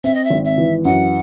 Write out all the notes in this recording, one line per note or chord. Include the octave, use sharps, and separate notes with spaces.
C4 E5
D#5
E5
G#1
E5
E3
F#2 F#5